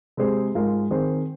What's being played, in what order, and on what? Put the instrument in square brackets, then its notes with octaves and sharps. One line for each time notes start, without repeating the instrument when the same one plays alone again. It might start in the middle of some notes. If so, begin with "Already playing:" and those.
[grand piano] C3 G#3 C4 G#4 C5
G#2 G#3 F4 A#4
D#3 C4 G#4 C5